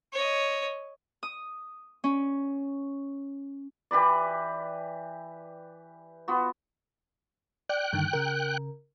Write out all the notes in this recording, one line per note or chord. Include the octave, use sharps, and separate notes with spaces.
C#5 D#5
D#6
C#4
E3 G4 B4 D5
B3 F4 F#4
D5 G5 F#6
G2 D3 D#3
C#3 A#4